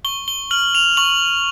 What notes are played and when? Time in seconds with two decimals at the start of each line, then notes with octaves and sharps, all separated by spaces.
0.04 C#6 G7
0.28 G7
0.51 F6 F#7
0.75 F7
0.97 C#6 F#7